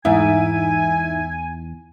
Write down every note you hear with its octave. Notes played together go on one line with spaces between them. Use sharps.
E2 G#2 E4 G#5